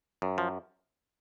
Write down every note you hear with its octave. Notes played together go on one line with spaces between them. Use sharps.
F#2
F3